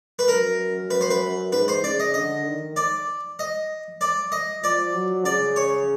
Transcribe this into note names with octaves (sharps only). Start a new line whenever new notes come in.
B4
F#2 A#4
B4
C5
B4
G#2 B4
C5
C#3 D5
D#5
D3 D#5
D#3
D5
D#5
D5
D#5
F3 D5
F#3
C#3 D5
C#5